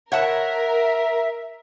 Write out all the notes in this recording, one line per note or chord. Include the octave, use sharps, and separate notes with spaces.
A#4 C#5 E5 F#5 A5